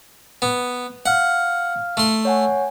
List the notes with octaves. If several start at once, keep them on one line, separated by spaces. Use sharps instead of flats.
B3
F5 F#5 F6
A3 C6
C#5 F#5 G#5